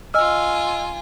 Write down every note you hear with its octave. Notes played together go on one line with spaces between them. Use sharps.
F4 D#5 G#5 E6 F6